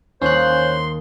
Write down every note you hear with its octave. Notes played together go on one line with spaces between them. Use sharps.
D#2 C#4 C5 C6 F#6